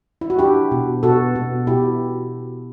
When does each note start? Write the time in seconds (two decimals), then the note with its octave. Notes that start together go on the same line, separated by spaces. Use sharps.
0.21 E4
0.30 F#4
0.39 D4 E4 G4
0.71 B2
1.03 B2 F#4 A4
1.35 B2
1.67 B2 E4 G4